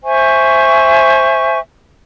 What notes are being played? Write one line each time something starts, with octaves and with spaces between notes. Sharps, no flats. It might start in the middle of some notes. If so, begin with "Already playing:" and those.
C5 E5 G#5 C#6